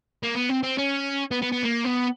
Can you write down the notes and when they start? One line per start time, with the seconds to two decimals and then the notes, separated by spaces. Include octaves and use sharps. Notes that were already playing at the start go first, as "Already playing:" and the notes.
0.23 A#3
0.35 B3
0.49 C4
0.63 C4
0.78 C#4
1.31 B3
1.42 B3
1.52 B3
1.63 A#3
1.84 B3